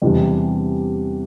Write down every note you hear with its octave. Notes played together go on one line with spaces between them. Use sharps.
E2 C3 E3 G3 D4